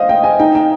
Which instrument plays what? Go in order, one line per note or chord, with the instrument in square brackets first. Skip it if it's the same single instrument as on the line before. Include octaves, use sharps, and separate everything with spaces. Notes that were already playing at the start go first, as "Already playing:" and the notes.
Already playing: [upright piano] C5 D#5 F5
G5
G#5
[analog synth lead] D#4 [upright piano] G5
[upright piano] G5